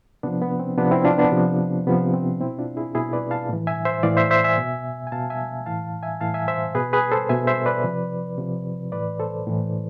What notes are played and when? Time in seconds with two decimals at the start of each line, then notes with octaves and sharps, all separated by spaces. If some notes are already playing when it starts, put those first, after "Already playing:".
0.23 C3 F3 B3 D4
0.41 B3
0.60 C4
0.78 C3 F3 B3 D4
0.91 C4 E4
1.05 D4 F4
1.18 B3 D4
1.32 C3 F3
1.87 C3 F3 B3
2.00 C4
2.13 C4
2.40 B2 C4 E4
2.59 D4 F4
2.77 E4 G#4
2.95 B2 E4 G#4
3.13 B4 D5
3.31 F5 A5
3.49 A2 E3
3.67 E5 G#5
3.85 C5 E5
4.03 A2 E3 D5 F5
4.17 C5 E5
4.31 C5 E5
4.44 E5 G#5
4.58 B2
5.07 G#5
5.12 B2 F5 A5
5.30 E5 G#5
5.66 A2 E3 F5 A5
6.03 E5 G#5
6.20 A2 E3 F5 A5
6.34 E5 G#5
6.48 C5 E5
6.75 B2 G#4 B4
6.93 G#4 B4
7.12 A4 C5
7.29 B2 E5 G#5
7.47 C5 E5
7.66 B4 D5
7.84 C3 F3
8.38 C3 F3
8.92 A2 E3 B4 D5
9.20 A4 C5
9.47 A2 E3